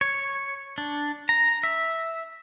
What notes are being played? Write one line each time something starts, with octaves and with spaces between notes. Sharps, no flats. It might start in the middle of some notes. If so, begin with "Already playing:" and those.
C#5
D4
A#5
E5